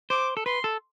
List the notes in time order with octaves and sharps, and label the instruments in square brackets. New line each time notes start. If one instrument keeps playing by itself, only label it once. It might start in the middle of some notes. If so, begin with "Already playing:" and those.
[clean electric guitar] C5 [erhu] D6
[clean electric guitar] A4
[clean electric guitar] B4 [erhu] C6
[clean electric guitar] A4